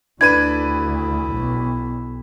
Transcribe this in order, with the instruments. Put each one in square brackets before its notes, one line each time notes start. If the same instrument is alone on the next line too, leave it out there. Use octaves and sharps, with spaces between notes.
[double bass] D2 [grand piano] D4 B4 D#7 [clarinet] E4 [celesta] G#6
[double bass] B1